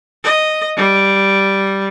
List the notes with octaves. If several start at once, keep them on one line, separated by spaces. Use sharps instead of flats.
D#5
G3